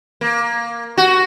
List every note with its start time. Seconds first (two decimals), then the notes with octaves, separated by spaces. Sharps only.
0.21 A#3
0.98 F#4